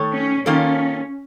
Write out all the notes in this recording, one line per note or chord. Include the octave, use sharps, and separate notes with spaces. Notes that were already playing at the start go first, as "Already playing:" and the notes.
Already playing: D#3 A3 A4 C#5
C#4
D#3 A#3 C#4 F4 A4